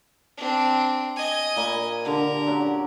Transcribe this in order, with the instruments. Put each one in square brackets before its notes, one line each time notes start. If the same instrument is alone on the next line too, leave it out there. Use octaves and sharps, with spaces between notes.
[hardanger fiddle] C4 D4
D#5 G#5
[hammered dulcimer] A#2 D5 B5
[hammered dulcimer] D3 G4 [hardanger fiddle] A#4
[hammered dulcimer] F#3 C#4 D5